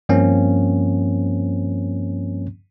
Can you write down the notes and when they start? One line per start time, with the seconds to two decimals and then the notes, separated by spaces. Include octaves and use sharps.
0.09 G2 F3 A#3 C4 C#4